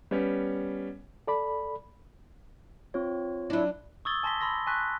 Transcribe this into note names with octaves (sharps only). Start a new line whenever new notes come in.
G3 B3 C#4
A4 D5 B5
C4 F4 C#5
F#3 D4 E4
C#6 D#6 E6 G#6 A6 G7
G#5 A5 C6 A#6 B6 G7
B5 C6 E6 A#6
G#5 A5 C6 C#6 F#6 B6